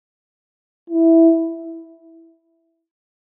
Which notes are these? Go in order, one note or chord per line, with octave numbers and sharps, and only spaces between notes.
E4